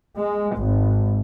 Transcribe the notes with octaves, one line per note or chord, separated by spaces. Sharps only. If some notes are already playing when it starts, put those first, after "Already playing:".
G#3
G#1